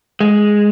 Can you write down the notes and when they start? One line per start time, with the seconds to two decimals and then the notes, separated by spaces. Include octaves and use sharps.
0.20 G#3